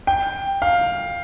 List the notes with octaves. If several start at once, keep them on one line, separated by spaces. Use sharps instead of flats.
G5
F5